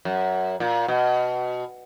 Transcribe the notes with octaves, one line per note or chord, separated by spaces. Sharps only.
F#2
A#2
B2